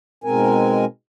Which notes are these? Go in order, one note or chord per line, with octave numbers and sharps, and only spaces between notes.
G#2 B2 G#3 C4 A#4 G#5